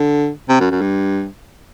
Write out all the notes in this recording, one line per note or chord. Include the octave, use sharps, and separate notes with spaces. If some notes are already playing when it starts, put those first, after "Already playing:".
Already playing: D3
C3
F#2
F#2
G2